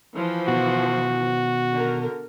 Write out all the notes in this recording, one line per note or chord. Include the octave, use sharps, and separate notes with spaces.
E3 F3
B2 D#3 F#4
D3 A#4